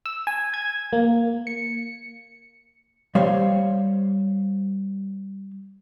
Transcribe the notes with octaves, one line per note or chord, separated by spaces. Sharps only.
E6
G#5
G#6
A#3
C#7
G3 C5 C#5 F5